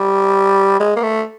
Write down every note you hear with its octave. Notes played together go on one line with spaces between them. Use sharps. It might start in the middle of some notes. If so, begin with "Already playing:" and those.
Already playing: G3
G#3
A#3
A3